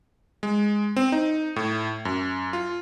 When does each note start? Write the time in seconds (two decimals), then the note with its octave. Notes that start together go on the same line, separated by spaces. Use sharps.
0.43 G#3
0.96 C4
1.12 D#4
1.56 A2
2.05 F#2
2.53 F4